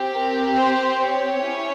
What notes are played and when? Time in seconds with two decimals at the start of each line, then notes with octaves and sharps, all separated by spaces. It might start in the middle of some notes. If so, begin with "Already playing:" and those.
Already playing: C4 G4
0.14 A#4
0.57 C5
1.00 C#5
1.42 C#4 E4 G4